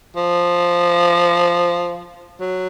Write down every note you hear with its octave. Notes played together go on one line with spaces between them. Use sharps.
F3
F#3